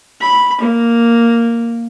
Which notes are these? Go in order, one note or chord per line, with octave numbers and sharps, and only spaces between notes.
B5
A#3